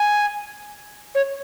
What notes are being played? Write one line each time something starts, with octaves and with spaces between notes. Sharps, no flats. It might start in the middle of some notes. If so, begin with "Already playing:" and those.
Already playing: G#5
C#5